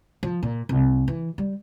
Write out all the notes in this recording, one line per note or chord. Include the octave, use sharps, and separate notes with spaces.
F3
A#2
C2
E3
G3